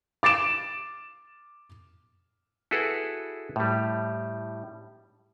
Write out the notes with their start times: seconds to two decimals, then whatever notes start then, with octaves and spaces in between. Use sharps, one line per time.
0.23 D6 A6 D7 E7
2.71 E4 F#4 G#4 A4 B4
3.56 A2 G3